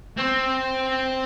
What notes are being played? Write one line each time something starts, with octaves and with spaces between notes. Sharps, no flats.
C4